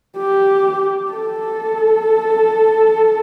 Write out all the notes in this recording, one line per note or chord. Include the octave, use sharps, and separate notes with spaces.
G4
A4